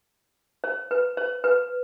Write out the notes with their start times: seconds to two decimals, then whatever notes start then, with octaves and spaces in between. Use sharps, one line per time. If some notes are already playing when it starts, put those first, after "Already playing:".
0.64 C5
0.91 B4
1.17 C5
1.44 B4